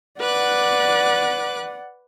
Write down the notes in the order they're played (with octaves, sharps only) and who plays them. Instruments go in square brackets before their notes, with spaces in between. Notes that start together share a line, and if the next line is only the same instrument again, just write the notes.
[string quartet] B4 D6 F#6 [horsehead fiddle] D5 F#5